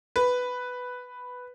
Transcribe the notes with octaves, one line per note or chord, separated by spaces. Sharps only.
B4